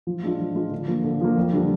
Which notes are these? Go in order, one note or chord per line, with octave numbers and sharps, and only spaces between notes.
F3
G#3 D4 F4
F3
G#3 D4 F4
D3
F3 A#3
D3
F3 A#3
F2
D3 G3 D4 F4